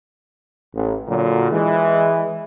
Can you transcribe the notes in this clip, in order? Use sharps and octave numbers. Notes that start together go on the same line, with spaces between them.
A1
A#2 D3 F#3
E3 G#3